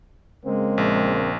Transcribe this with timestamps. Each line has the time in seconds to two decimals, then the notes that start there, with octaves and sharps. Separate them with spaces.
0.45 C#3 G#3 A#3 C4
0.78 A#1